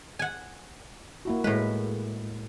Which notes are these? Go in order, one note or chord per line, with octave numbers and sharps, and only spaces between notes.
F#5 G#5
A#3 E4 F#4
A2 G#3 E4 B4